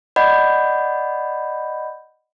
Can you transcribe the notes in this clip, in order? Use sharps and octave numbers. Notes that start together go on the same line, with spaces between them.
D5 D#5 F#5 B5 G6